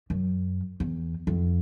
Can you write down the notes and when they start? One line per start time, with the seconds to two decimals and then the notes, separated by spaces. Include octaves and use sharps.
0.10 F#2
0.80 E2
1.27 F2